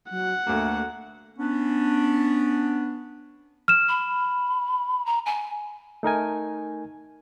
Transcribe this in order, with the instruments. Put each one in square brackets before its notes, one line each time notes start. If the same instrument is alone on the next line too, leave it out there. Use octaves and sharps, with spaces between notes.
[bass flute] F#3 [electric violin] F#5
[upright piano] D2 A#3 [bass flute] A3
[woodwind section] B3 C#4 D4
[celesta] F6 E7
[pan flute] B5
A#5
G#5
[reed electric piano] A3 D#4 A#4 G#5